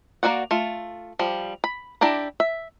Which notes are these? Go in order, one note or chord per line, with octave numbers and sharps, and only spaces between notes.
A#3 E4 F#4 D5 F#5
A3 F4
F3 G3
B5
D4 E4 G4 A#5
E5